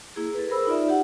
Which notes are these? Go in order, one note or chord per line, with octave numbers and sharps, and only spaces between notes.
A#3 E4 G#4
A4 B4
G#4 A#4 C5 B5 E6
D#4 F4 D5 E5
G4 F#5